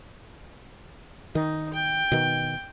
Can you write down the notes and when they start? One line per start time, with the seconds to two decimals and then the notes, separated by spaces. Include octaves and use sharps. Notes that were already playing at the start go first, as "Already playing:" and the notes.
1.35 D#3 D#4
1.74 G5
2.12 B2 D#3